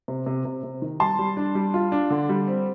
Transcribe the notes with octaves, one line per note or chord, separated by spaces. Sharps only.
C3
C3
C3
C3
D#3
G3 A5 C6
G3
D4
G3
F4
D4
D3
G3
C4